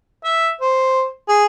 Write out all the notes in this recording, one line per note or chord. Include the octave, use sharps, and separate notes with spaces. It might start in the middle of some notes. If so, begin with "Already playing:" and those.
E5
C5
G#4